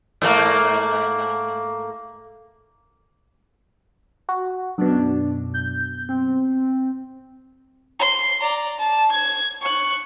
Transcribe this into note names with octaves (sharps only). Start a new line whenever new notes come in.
G#2 A3 A#3
F#4
F#2 B2 D4
G6
C4
C6
D5 A#5
A5
G#6
C#6 F#6